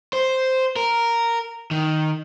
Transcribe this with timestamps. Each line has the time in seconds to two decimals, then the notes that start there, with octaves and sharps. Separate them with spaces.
0.13 C5
0.76 A#4
1.71 D#3